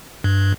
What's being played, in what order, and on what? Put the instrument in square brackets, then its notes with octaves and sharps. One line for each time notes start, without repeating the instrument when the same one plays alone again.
[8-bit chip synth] G2